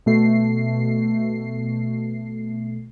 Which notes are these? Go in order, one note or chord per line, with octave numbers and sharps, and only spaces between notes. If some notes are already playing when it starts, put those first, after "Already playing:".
B2 A3 C7